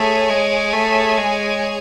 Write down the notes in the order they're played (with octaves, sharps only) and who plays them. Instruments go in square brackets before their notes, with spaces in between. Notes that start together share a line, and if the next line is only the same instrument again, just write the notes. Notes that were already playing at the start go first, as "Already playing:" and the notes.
Already playing: [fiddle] A3 [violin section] G#4 C#5 G#5
[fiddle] G#3
A3
G#3